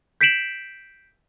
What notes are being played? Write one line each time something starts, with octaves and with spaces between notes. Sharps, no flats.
G6 B6 C7 D7 E7 F#7